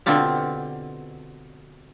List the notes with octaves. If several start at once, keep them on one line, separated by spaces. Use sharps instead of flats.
B2 D3 C4 F4 G4